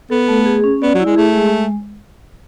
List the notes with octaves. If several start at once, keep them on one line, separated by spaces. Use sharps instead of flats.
B3 A4
A3
G#4
C#4
B3 D5
F#3
E4
G#3
A3 G#4
G#3